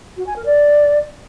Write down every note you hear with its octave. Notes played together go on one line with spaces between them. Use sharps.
F#4
G#5
A#4
D5